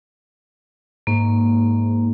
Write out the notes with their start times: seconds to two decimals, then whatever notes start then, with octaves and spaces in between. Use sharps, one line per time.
1.07 G#2 A#3